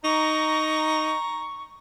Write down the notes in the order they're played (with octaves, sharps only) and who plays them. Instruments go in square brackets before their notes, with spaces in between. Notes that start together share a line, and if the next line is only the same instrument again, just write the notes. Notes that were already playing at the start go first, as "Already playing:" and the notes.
[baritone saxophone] D#4 [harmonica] A#5 [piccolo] C#6